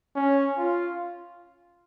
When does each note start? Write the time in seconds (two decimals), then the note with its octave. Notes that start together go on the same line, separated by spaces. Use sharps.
0.16 C#4
0.58 F4